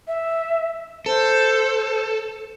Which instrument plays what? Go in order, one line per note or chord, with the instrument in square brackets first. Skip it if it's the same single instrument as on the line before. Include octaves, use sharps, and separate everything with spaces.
[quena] E5
[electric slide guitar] A4 [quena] C5